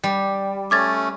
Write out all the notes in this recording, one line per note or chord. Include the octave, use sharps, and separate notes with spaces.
G3
A3 C#4 D6 G#6 A6